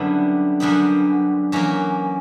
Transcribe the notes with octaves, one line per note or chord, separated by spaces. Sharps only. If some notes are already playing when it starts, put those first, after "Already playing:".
Already playing: F#2 D3 G3 B3 D4 E4
F#2 D3 G3 B3
F#2 E3 A#3 C#4